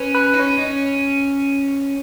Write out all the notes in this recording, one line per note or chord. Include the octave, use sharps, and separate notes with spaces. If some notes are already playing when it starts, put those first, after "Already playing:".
Already playing: C#4 B4 C#5
B4
D#4
C#4 C#5
D#4
C#4